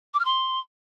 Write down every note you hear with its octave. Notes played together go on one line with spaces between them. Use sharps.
D6
F6
C6